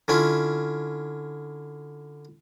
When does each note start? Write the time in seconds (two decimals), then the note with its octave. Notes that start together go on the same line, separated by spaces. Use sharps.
0.08 D3 C#4 E4 F4